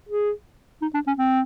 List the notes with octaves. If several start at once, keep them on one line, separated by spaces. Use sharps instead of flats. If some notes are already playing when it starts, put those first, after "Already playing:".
G#4
D#4
D4
C#4
C4